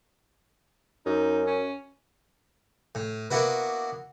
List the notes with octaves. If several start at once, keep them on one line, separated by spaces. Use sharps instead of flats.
F#2 D#4
C#4
A2
A#3 B3 D4 E4 F#4 B4